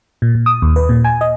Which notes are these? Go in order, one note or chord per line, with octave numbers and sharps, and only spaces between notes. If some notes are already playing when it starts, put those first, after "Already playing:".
A#2
A#2
D#6
D#2
B4
A#2
G#5
D#5